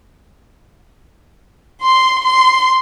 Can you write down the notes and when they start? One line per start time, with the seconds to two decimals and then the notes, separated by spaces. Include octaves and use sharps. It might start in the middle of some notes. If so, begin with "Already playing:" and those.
1.83 C6
2.25 C6